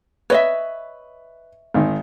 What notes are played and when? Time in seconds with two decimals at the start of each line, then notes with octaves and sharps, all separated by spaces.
0.30 B4 C#5 D#5 E5
1.74 G#1 D#3